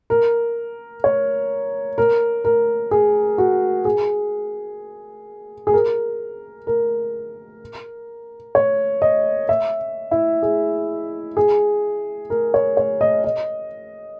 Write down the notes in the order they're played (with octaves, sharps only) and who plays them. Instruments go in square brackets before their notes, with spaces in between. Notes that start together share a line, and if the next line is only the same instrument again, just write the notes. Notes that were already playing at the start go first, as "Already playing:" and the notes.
[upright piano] A#4
C#5
A#4
A#4
G#4
F#4
G#4
G#4
A#4
A#4
C#5
D#5
E5
E4
G#4
G#4
A#4
C#5
C#5
D#5
D#5